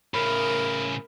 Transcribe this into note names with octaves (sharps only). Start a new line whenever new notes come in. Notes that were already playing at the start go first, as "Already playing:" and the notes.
A2 C#3 A#4 B5